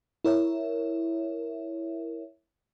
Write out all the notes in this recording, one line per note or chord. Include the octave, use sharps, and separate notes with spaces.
E4 A#4 C#5 E5